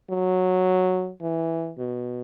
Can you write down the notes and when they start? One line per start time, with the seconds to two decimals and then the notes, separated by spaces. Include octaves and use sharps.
0.10 F#3
1.22 E3
1.78 B2